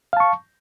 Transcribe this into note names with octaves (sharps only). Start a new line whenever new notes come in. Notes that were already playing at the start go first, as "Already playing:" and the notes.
F5 A5 C#6